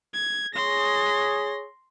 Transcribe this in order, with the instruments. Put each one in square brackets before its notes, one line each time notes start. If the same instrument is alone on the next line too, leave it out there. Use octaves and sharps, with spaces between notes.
[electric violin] G#6
[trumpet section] G#4 C#5 [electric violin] C6 A#6